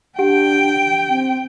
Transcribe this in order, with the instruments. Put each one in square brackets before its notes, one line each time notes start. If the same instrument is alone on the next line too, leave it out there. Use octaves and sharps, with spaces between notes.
[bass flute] D4 [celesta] G4 F#5 D7 [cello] G5
[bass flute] C4